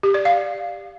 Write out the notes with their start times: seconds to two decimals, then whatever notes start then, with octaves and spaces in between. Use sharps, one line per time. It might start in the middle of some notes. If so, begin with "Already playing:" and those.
0.03 G4
0.14 D5
0.25 F5